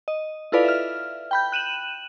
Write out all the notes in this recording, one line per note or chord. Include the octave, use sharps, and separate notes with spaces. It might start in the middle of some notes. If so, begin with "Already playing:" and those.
D#5
E4 F4 A4 B4 D5 F5
E5 F6
G5 B5 G6
F#6 D#7 E7 F#7